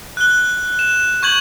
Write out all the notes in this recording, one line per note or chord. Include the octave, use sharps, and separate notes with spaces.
F#6 G7
E7
C#6 G6 G#6 F#7